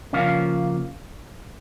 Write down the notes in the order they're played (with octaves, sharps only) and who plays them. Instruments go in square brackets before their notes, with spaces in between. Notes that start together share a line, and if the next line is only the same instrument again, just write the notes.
[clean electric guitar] C#3 F3 A#3 C#4 F5